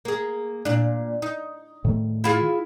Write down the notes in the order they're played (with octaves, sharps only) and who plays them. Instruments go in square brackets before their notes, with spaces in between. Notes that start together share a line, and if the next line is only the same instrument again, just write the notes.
[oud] A#3 G#4
A#2 D4
D#4
[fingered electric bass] A2 D#3 A3
[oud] E4 F4 G#4